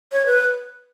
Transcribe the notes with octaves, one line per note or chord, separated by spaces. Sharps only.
C#5
B4